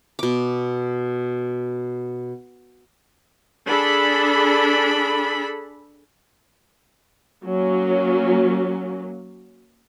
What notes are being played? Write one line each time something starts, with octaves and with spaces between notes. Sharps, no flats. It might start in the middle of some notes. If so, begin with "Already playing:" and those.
B2 D6
D4 G#4 A4 B5
F#3 A#3 C#4